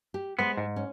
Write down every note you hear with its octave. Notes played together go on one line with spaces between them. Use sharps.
G4
G#3 B3 C5
G#2
C#4